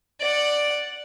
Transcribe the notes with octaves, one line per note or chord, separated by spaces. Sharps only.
D5 F#5